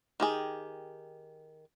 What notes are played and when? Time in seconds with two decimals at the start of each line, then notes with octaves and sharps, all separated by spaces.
0.20 D#3 G4 G#4